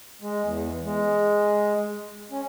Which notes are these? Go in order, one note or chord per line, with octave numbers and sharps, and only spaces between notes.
G#3
E2
G#3
C#4